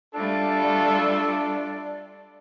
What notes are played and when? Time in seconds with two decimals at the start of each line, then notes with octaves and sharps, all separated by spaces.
0.14 G3 A3 D4 F4 A4 D5